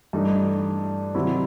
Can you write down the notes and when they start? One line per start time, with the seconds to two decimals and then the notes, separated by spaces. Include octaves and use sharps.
0.13 G2 E3 A3 D#4
1.14 C3 D#3 F#3 C4 E4